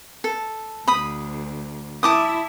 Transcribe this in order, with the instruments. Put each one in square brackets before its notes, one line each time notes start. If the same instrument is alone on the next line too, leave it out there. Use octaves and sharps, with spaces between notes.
[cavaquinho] A4
[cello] D2 [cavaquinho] B5 D#6
[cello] E4 E5 [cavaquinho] A5 D6 D#6